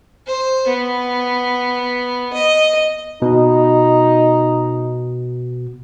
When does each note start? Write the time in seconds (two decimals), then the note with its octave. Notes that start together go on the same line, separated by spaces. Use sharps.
0.27 C5
0.67 B3
2.33 D#5
3.22 B2 D#4